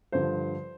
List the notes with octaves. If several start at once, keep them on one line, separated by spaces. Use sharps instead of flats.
G2 D3 F3 C5